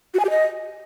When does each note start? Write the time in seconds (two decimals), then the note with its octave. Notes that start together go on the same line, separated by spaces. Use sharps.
0.14 F#4
0.19 G#5
0.25 G4
0.30 D#5